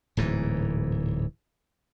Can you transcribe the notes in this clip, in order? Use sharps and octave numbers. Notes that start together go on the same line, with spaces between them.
D1 G#2 E3